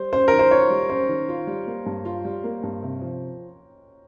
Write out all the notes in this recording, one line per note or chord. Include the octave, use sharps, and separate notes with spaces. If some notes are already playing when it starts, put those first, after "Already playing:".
Already playing: G3 C5
C#4 C5
D#3 A#4
C5
F4 C#5
G3
C#4 C5
D#3
F4
G3
A#3
G2
F4
G3
A#3
G2
C3
F3